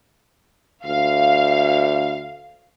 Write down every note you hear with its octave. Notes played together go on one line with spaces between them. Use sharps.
D2 F5